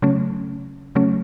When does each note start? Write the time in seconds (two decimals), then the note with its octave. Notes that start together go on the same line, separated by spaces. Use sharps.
0.02 C#3 F#3 A3 C#4
0.95 C#3 F#3 A3 C#4